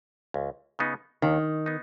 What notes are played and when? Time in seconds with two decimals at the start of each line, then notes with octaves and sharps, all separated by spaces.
0.34 C#2
0.79 C#3 B3 D#4
1.22 D#2 D#3
1.66 B3 D#4